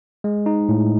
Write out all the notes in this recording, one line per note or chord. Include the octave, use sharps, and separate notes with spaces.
G#3
D#4
A2